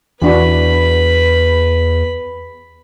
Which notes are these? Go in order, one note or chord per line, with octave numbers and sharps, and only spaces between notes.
E2 E3 D4 F#4 B4 B5